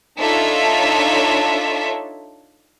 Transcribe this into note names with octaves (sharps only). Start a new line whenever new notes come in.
D4 D#4 F4 A4 C#5 E5